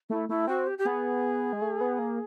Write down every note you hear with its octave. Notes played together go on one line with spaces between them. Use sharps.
A3 E4
A3 E4
C4 F#4
G4
G4
B3 G#4
G#3
A3
B3
A#3